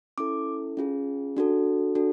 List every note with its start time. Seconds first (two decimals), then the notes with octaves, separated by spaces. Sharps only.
0.18 C#4 E4 A4 D6
0.77 C#4 F4 G#4
1.37 D4 F#4 A4
1.95 D4 F#4 A4